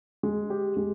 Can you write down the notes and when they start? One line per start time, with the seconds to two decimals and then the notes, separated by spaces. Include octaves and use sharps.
0.23 G#3
0.50 G4
0.77 G#3